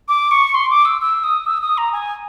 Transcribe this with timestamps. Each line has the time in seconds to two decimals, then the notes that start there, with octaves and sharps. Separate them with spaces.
0.08 D6
0.31 C#6
0.55 C6
0.70 D6
0.85 E6
1.01 E6
1.24 D#6
1.46 E6
1.62 D#6
1.78 A#5
1.93 G#5